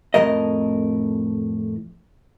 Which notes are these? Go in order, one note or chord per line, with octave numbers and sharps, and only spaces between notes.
F2 A2 F3 A#4 D#5